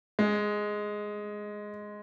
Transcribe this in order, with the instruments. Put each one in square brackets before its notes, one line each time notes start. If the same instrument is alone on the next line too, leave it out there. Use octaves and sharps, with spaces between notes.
[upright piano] G#3